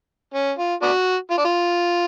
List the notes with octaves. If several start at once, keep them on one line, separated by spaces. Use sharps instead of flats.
C#4
F4
B3 D4 F#4
F4
D4
F4